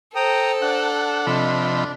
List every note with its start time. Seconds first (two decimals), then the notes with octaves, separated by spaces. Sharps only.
0.15 A4 C5 G5 A#5 D#6
0.62 D4 F#5
1.27 C3 F3 D#5 B5